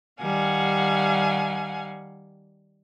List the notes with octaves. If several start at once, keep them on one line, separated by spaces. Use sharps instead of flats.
D#3 G3 F5 F#5 G#5